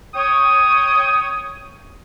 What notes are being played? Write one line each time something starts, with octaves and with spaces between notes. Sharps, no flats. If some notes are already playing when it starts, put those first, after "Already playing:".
C#5 G5 D#6